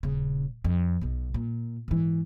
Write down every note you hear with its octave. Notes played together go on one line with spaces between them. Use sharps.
D#1 C#3
F2
B1 B2
A#2
G#2 E3